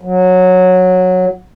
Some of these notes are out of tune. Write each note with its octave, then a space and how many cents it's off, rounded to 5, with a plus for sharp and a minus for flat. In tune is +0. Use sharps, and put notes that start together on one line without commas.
F#3 -15